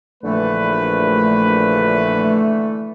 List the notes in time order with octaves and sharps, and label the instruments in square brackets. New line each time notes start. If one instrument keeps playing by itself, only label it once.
[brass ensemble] A#1 B4 [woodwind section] D3 E3 A3